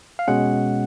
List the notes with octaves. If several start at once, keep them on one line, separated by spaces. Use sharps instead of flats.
F5
B2 G#3 C#4 F#5